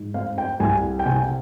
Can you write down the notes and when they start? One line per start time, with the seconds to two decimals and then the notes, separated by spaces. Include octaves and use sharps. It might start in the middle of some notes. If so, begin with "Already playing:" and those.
Already playing: G#2
0.14 C4 F5
0.38 G5
0.60 C2 G#5
0.99 G5
1.06 C3 G#5